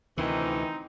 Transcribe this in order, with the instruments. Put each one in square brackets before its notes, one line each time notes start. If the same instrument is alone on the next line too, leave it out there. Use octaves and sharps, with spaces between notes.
[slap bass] D2 C3 [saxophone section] D#3 E3 [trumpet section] C4 D#4